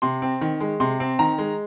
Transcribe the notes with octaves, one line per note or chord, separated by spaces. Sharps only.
C3 C6
C4
D#3
G#3
C3 C6
C4
D#3 A#5
G#3